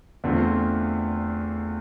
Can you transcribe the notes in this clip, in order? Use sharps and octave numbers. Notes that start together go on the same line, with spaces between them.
E2 D3 A3 C4 F4